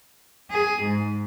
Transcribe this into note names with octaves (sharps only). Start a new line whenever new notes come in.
G#4
G#2